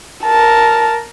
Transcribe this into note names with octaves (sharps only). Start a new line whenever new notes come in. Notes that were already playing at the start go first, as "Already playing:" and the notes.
A#4 A5